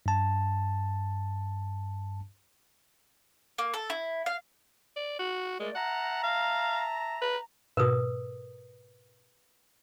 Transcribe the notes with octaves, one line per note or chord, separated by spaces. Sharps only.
G2 A5
A#3
A4
E4
F5
D5
F#4
G#3 A3 A#4 D5
E5 F#5 A5 A#5
F5
B4
G#2 B2 A#4 B4 D#6